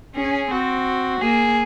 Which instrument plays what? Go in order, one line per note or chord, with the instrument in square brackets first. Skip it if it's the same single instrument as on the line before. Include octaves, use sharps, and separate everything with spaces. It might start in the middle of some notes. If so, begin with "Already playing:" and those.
[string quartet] C#4 [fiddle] G#4
[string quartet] C4 [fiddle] F#4
[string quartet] A#3 [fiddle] G#4